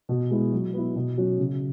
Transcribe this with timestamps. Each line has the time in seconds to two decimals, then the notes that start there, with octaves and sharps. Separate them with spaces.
0.09 B2
0.31 G#3 B3 E4
0.52 F#3
0.73 B3 E4
0.96 B2
1.17 F#3 C#4 F#4
1.39 C#3